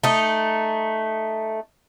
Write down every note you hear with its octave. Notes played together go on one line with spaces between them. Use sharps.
A3 D#4